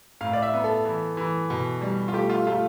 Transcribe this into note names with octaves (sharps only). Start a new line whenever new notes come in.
A2 F5
D5
E5
B3
A4
E3
E3
B2
G3
F4
A3 G4
F4
A3 F4